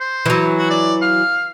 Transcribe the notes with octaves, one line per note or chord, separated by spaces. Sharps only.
C5
E3 F#3
F#4
D5
F5